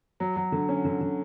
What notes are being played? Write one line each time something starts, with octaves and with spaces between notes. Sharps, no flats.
F#3
F#3
D3
C#4
D3
D3